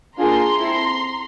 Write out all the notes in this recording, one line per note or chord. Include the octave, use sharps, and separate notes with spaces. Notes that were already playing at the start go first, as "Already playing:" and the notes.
A#3 D4 F4 G#4 A#5 C6
C4 E4 A4